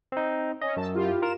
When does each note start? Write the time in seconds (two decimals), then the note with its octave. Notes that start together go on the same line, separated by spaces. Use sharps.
0.12 C4 D#4
0.62 C#4 D#5
0.77 F#2 A5 E6
0.93 E4 F4 G4
1.22 F4 A#4 E7